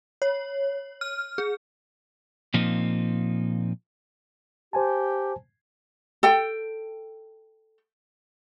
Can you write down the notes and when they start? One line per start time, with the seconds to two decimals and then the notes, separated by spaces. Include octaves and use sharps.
0.22 C#5
1.01 F6
1.38 G#4
2.54 A#2 F3 A#3 C4 D#4
4.73 G4 C5 G#5 A5
6.23 A4 G5